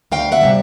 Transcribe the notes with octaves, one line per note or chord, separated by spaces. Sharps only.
D2 F5 G5
E5 F#5
C3 D#3 G3